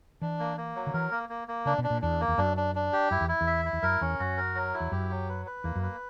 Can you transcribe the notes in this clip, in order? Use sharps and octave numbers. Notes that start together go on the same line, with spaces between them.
E3 D4
A#3
A#3
F#3
D3
E3 A#4
A#3
A#3
A#3
C#3 D4
B2
D4
A#2
E2 D4
A#3
E2
F#2 D4
D4
D4
G4
F#2 E4
E2
E4
E2
E5
E4
E2
F#2 A#4
E2 C#4
F#2 F#4
A#4
F#3
E4
E2
F#2 G4
F#3
B4
B4
E2 A#3
F#2
B4